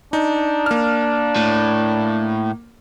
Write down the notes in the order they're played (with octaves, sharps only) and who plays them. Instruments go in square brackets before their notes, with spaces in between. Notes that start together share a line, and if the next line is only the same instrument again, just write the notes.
[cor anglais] D4 [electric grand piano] D#4
[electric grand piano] A#3 F6
[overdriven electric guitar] A2